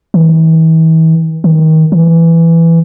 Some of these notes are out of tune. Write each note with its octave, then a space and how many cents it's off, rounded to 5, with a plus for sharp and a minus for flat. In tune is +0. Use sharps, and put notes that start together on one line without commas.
E3 -40
D#3 +25
E3 +10